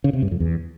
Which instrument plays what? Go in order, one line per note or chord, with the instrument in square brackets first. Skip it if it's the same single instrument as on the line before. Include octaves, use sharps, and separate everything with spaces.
[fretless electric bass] C#3
C3
G2
F2
E2